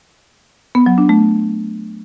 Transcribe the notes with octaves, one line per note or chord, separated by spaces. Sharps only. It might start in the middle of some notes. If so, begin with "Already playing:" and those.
B3
F#3
D4
A3